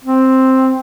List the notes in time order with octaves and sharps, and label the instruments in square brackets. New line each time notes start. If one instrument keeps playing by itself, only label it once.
[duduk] C4